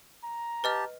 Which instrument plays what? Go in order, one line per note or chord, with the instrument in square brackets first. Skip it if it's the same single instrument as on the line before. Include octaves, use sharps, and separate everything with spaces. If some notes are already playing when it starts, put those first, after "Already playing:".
[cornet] A#5
[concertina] G4 A5 [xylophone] B4 D#5 F6